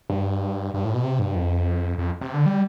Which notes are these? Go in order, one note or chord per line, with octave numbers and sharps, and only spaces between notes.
G2
G2
A2
B2
C3
G2
F2
F2
C3
D3
G3